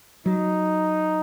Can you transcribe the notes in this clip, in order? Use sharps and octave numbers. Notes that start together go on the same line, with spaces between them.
F#3 D#4